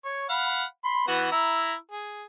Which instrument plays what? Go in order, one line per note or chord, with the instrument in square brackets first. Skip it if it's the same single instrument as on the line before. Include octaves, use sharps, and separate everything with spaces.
[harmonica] C#5
F5 F#5 B5
B5 C6
E3 B3 F#4
E4 A#5 E6
G#4